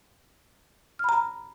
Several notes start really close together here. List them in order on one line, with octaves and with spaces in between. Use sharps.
F6 B5 A#5